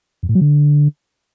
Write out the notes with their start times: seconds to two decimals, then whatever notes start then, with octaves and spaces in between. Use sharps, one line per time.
0.23 F2
0.29 A2
0.35 F#3
0.41 D3